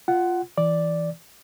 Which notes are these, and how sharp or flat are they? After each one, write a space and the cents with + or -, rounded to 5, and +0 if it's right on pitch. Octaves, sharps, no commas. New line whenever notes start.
F4 +0 F#5 +15
E3 +0 D5 +0